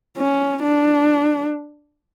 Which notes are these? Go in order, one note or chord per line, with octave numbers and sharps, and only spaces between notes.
C#4
D4